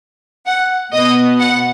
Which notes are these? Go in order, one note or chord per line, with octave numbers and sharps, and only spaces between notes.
F#5
B2 B3 D#5
F#5